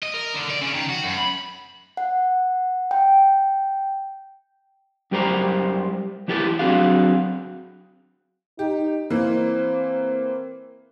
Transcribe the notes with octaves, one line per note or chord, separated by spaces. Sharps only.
D#5
A#4
D3
D5
C#3
D#3
F#4
F#2
B5
F#5
G5
F#2 G3 G4 A#4 C5 A#5
E3 E4 G4 A#4 D5 A5
F#3 C4 D4 F#4 G#4 F5
D#4 G4
E3 A#3 C4